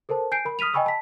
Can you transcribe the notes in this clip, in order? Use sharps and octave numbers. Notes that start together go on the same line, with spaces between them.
A4 A#4 C5 A5
G#5 G6 C7 D7
A#4 B5
D#6 F6 B6 D#7 F7
D#5 G5 G#5 B5 C#6 E6
A5 B6